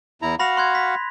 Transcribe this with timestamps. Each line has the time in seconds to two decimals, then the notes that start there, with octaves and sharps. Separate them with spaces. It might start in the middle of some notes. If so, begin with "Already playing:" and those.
0.22 E2 E4 A#5
0.39 F#4 F5 F#5 B5 A#6 F7
0.57 C6 F#6 G#6
0.75 B6